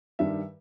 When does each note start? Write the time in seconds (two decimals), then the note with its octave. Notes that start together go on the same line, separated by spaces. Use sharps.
0.19 G2 D#3 G3 E5